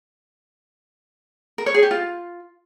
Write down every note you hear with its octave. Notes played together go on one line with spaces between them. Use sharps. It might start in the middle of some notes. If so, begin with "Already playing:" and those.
A#4
C#5
G#4
G4
F4